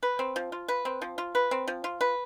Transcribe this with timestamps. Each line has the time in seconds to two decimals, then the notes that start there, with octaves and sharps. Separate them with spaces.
0.03 B4
0.19 C4
0.36 F3
0.52 F4
0.68 B4
0.85 C4
1.02 F3
1.18 F4
1.35 B4
1.51 C4
1.68 F3
1.84 F4
2.01 B4